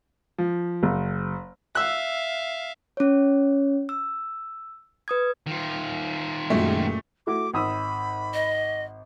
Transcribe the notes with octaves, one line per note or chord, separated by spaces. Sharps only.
F3
F#1
E5 F5 E6 F#6
C#4 C#5
E6
B4 D#6 G#6
D#3 F4
F#1 A#2 F#3 G#3 A3
A3 E4 F#4 D6
G#1 B5 D#6 E6
D#5